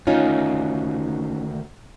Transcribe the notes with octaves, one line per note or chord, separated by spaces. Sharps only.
D2 D#3 C#4 D#4 F4